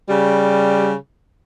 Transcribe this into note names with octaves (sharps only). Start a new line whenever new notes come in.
C#3 G3